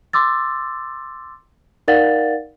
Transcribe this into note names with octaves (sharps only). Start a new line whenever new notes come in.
C6 D6 E6 A6
D#4 A#4 D5 F5 F#5 A6